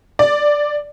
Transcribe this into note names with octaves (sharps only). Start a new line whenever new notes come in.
D5